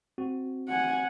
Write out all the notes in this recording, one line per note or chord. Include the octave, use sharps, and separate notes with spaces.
C4 F#4
F#5 G#5